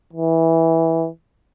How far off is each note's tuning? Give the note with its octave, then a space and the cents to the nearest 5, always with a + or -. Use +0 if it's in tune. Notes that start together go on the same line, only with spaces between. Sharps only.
E3 -10